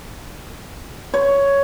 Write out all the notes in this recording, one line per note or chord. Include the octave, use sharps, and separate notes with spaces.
C#5